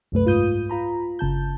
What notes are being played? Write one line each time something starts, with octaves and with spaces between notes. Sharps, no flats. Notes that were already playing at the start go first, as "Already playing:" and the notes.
C2 F#2 A3 B4
G#2 F4 D#6 G6 D#7
F4 A#5 B5
G1 C#3 A5 G6